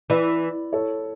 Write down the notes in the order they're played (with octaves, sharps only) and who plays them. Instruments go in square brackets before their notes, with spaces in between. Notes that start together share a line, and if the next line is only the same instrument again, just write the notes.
[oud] E3 [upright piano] B4 D5
[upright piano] A4 C#5